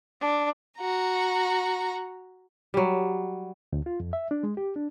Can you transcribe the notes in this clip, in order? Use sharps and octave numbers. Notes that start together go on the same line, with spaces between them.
D4
F#4 A#5
F#3 G3
D2
F4
F2
E5
D4
G#3
G4
D4